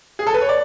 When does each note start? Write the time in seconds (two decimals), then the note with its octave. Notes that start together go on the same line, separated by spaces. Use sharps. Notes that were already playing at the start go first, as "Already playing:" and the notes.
0.19 G#4
0.27 A4
0.34 B4
0.41 C#5
0.49 D5